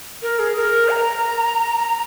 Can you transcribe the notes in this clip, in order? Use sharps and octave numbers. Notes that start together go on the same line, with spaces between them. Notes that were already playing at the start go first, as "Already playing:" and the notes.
A#4
G#4
A#4
A#5